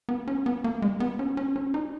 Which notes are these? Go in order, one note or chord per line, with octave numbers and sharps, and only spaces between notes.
B3
C#4
B3
A#3
G#3
B3
C#4
C#4
C#4
D#4